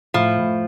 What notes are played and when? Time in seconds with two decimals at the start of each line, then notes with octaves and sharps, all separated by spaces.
0.14 A2 F3
0.39 A2